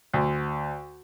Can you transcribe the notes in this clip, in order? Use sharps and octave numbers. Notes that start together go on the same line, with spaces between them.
D2